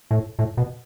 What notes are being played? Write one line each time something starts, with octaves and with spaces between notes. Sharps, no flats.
A2
A2
B2